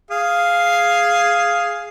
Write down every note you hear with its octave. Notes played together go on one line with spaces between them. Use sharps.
G#4 F5